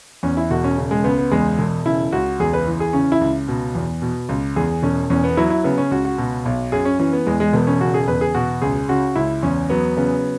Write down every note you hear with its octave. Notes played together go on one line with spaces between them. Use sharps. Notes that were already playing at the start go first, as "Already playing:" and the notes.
E2 C#4
E4
E1 F#4
C#4
C#3
G#3
C#2 B3
B3
E2 G#3
E1
C#3 E4
C#2 F#4
E2 G#4
B4
E3
G#4
C#3 C#4
E4
C#2
B2
E2
B2
C#2
E2 G#4
E1 C#4
E2 C#4
B3
F#3 E4
E4
C#3 B3
C#4
C#2 F#4
F#4
B2
B1
F#2 G#4
C#4
E3 C#4
B3
E2 G#3
G#3
E1 B3
C#4
C#3 F#4
G#4
E2 B4
G#4
B2 F#4
C#2 G#4
C#3 F#4
C#2 E4
E2 C#4
F#3 B3
C#3 B3